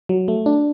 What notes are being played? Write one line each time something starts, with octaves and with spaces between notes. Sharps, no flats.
F#3
A3
D4